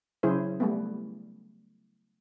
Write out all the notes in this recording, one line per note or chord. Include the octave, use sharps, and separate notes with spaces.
C#3 F#3 E4 G#4 C5
G3 A3 B3